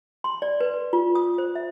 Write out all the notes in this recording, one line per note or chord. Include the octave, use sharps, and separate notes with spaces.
C6
D5
B4
F4
D#6
C5
E5